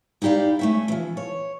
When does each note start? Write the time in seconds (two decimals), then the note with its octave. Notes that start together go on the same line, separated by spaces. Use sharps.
0.22 D#4 E4 G4 D5 F5
0.59 A3 C#4 E5
0.88 E3 F3
1.17 C#5